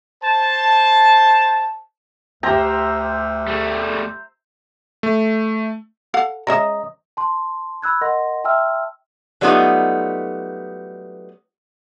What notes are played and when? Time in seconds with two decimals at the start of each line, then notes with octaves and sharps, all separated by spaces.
0.23 C5 A5
2.43 D2 G4 C5 E5 G5 A#5
3.47 G3 A3
5.03 A3
6.14 A4 F5 F#5
6.47 G#3 C#4 D#5 E5 A#5
7.17 A5 C6
7.82 B5 E6 F#6 G#6
8.01 A#4 D#5 F#5 C6 A#6
8.44 E5 G5 A5 C6 E6 F6
9.41 F#3 G3 A3 B3 D#4 F4